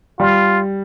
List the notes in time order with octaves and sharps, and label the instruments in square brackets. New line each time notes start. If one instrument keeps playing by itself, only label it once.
[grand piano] G3 [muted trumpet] F4